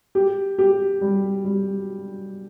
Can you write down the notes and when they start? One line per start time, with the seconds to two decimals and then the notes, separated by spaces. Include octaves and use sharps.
0.15 G4
0.58 G4
1.01 G3
1.45 G3